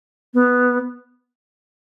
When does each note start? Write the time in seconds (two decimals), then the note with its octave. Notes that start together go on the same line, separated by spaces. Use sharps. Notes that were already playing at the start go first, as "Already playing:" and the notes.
0.34 B3